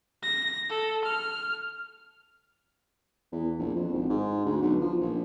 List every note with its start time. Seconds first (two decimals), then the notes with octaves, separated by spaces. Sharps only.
0.23 A#6
0.70 A4
1.05 F6
3.32 E2
3.59 A#1
3.76 F2
3.93 G#1
4.09 G#2
4.45 D2
4.62 B1
4.81 F3
5.01 A#1